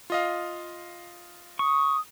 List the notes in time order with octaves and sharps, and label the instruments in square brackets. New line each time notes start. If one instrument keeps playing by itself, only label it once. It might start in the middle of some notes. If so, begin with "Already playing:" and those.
[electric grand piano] F4 D#5 F5
[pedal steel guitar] C#6 [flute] D#6